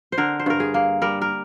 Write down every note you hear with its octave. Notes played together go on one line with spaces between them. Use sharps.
C5
D3 A#4
C5
G2 A#4
G#4
A#3
G3 A#4
A#4